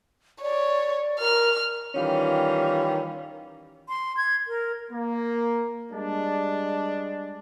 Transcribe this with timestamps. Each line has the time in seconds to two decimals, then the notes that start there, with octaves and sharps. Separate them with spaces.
0.42 C#5 D5
1.20 A#4 F6
1.95 D#3 E3 G3 C#4 F4
3.89 C6
4.17 G#6
4.48 A#4
4.91 A#3
5.91 G3 G#3 D4